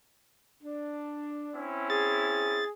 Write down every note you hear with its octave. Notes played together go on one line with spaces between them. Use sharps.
D4
C4 C#4 E4
G#4 A6